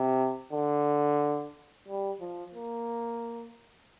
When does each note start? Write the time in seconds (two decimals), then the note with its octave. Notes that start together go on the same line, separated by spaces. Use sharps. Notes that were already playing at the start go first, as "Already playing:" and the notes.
Already playing: C3
0.53 D3
1.88 G3
2.21 F3
2.54 A#3